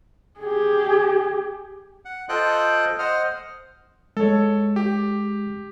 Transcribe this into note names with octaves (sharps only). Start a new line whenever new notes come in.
G4 G#4
F#5
F4 A4 C5 D#5 G5 F#6
C5 D#5 F#5 F6
G#3 A4 C#5
G4